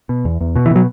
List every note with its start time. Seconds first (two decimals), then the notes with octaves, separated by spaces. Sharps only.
0.09 B2
0.25 E2
0.41 E2
0.56 B2
0.66 E3
0.71 B2 F#3